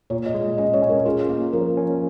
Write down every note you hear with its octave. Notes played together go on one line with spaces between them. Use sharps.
A#2 C#5
D#5
G#3
C#4 D#5
C#5
C#4
A#4
F4 G#4
A#3
F3 A#4
C#4